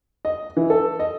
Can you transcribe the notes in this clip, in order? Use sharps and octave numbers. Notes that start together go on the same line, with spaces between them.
D#5
E3
A4
D#5